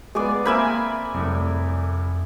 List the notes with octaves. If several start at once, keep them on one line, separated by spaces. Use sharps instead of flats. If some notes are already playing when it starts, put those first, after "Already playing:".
G#3 B3 G#4 D5
A#3 C4 E5 G#5 B5
C2 F2 A2